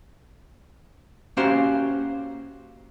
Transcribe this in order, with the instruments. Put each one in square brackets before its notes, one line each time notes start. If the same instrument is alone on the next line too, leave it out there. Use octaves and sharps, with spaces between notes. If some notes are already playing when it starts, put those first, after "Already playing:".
[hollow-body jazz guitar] A#3 C#4 F#4 G4 C5 F5